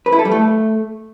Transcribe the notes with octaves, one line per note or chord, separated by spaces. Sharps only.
B4
E4
A4
G3
A3